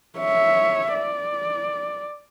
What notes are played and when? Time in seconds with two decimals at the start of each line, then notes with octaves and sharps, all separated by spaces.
0.19 C#5 E5
0.93 D5